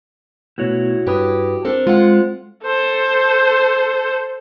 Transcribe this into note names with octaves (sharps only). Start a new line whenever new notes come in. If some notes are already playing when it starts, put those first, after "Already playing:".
B2 A3 B3 E4 F#4 C#5
G2 G4 B4 D#6
C4 D4 A4 A#4 C5
G#3 F4 F5 F#5
A4 C5